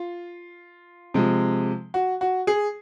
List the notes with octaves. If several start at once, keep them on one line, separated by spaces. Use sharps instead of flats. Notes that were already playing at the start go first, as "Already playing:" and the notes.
Already playing: F4
C3 F3 G#3
F#4
F#4
G#4